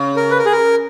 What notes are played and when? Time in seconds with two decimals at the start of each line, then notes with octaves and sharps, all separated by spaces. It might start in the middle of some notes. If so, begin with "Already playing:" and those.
Already playing: C#3
0.17 A#4
0.31 B4
0.39 A#4
0.45 G#4
0.52 A#4